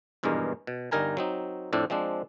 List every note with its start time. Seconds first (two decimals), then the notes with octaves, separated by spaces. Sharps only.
0.23 G#1 E2 G2 B2 G#3 A#4
0.67 B2
0.91 G1 G3 D#4 A#4 G#5 A#5
1.17 F#3 C4 D#4
1.73 F2 A2 C4 D4
1.90 F3 G#3 C4 D4